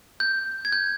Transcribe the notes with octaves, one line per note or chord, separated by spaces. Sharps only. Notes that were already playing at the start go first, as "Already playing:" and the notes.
G6
G#6
G6